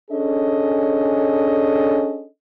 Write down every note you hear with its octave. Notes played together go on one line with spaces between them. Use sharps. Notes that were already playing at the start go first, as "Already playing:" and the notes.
C#4 D4 G#4 A4 D#5